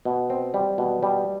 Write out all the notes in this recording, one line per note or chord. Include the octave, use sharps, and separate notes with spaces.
B2
C4
G3
B2
G3